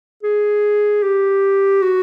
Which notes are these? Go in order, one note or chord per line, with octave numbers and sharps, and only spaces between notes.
G#4
G4
F#4